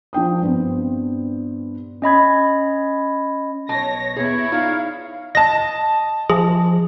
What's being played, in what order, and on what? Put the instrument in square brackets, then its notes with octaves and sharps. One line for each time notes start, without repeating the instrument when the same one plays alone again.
[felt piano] F3 D4 G5 D#6
G2 B3 C4
[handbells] C#4 D#5 B5 G#6
[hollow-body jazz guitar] B1 D#5 A5 [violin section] C#5 A#6
[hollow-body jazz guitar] B3 G#4 [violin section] E4 [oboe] C#5
[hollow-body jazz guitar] D#4 F4 D5 [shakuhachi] F5
[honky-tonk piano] D#5 A5 [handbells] A#6
[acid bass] F3 [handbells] G#4